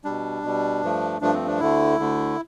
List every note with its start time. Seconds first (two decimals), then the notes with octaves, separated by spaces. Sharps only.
0.05 B2 G3 D4
0.43 B2 G3
0.81 G2 F3 A3
1.21 G2 F3 A3 D4
1.33 C4
1.47 D4
1.60 D2 D3 A3 E4
1.99 D2 D3 A3